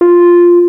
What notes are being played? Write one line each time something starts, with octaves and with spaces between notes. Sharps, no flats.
F4